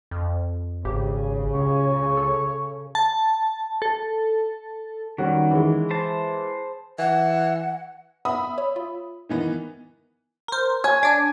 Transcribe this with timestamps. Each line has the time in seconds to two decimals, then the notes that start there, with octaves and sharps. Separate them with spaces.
0.11 F2
0.85 G#1 C#3 G4
1.54 C#2 C#5
2.17 A4
2.95 A5
3.82 A4
5.18 D#3 G3 C#4 F#4
5.51 E3 G#3
5.90 C5 A5
6.99 E3 F#5
8.25 B3 E5 B5 D#6
8.58 C#5
8.76 F4
9.29 D#3 E3 B3
10.48 A#4 C5
10.84 C#5 G#5
11.03 D4 D5